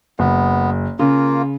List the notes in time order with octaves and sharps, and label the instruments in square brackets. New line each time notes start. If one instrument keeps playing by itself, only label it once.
[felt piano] F#1 [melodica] B3
[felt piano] C#3 [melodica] A#3 F4